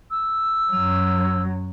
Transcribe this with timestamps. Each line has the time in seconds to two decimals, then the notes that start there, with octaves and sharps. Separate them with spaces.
0.11 E6
0.72 F#2 F#3